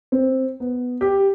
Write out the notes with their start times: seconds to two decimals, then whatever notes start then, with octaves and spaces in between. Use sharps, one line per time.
0.12 C4
0.60 B3
1.01 G4